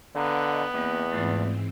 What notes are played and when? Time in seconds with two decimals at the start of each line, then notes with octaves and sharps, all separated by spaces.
0.15 D3 B3 B4 D#5 F5 G5 A#5 F#6
0.74 E2 A#3 C4
1.12 G#2 E3 A3 C4 F4 D5